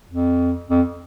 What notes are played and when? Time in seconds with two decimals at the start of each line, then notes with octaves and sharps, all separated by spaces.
0.09 F2
0.70 F2